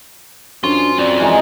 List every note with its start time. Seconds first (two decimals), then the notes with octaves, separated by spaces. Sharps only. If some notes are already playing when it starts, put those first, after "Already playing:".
0.64 F#2 D4 F4 C5 C6
0.98 C4 F4 D5
1.20 E3 G#3 D#4